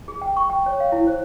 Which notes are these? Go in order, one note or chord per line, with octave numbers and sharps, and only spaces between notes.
G#4
G5
C#6
G5
C#5
F5
E4
C5